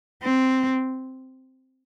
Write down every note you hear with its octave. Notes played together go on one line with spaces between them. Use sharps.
C4